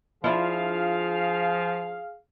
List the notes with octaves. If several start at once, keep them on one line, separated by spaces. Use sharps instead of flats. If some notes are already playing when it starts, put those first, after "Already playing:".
F3 D4 E4 F4 G#4 F5